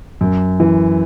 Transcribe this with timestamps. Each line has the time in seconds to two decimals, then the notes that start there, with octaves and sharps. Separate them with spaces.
0.21 F#2
0.60 E3